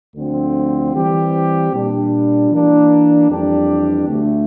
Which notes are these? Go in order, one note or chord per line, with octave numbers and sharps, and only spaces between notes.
D2 D3 F3 C4
E3 G3 C4 G4
A#2 G3 D4
E3 A#3 D4
F2 E3 G3 D4 G4
D2 D3 A3